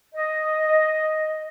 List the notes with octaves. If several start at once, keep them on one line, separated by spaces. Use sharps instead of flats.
D#5